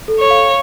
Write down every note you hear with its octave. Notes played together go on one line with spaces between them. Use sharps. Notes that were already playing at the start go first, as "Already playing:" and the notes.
A4
C#5
F5